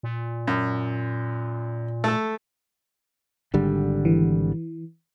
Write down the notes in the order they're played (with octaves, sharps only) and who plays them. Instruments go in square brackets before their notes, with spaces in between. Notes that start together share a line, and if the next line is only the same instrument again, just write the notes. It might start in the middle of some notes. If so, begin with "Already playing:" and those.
[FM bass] A#2
[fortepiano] F#2
A3 A4
[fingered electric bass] G#1 D3 G3
[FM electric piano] E3